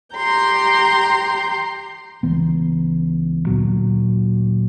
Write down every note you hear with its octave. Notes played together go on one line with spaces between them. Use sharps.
G4 A#5 C6 G6
C#2 E3 B3
D2 A#2 D3 F#3